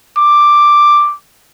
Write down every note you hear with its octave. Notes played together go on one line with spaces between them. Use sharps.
D6